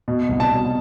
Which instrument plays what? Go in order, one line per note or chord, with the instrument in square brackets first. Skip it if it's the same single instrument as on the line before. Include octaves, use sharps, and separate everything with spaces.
[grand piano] B2
C2
A5
B2